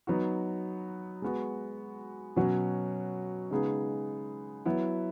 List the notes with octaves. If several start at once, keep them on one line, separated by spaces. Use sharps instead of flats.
F#3 B3 D#4 F#4
G#3 B3 F#4
B2 F#3 C#4 F#4
C#3 G#3 B3 D#4 G#4
F#3 B3 E4